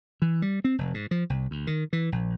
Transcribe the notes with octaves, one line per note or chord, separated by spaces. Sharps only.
E3
G3
C4
F1
G#2
F3
C2
D2
D#3
E3
A#1